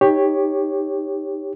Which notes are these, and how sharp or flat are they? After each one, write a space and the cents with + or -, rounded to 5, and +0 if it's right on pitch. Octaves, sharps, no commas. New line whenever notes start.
D#4 +0 G4 +10 C#5 -5